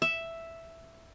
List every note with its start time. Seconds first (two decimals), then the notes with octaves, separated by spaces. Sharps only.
0.02 E5